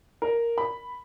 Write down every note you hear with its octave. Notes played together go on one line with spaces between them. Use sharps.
A#4
B5